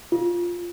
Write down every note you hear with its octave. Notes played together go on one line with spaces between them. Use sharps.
F4